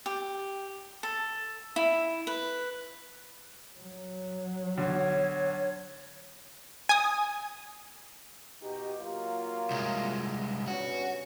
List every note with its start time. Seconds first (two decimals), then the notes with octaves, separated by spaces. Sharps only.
0.06 G4
1.03 A4
1.76 E4
2.27 B4
3.79 F#3
4.78 B1 D3 C#5
6.89 G#5 D#6
8.62 B2 D#4 G4
9.00 F#3 A#3 F4
9.71 C2 G#3
10.67 G2 B3 C#4 F#4